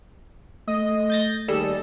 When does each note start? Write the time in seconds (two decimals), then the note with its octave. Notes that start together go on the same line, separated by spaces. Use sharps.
0.68 A3 D#5
1.10 G6 A6 A#6
1.48 D#2 G3 G#4 A4 E7